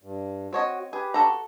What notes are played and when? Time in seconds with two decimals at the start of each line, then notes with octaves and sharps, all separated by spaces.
0.03 G2
0.53 C4 F#4 C#5 D#5
0.93 G4 G#4 B4
1.14 F#4 A4 A#5